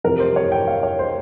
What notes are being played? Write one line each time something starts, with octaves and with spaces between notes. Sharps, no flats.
F2 C3 E3 G3 A#4
C5
C#5
G5
F5
C#5
C5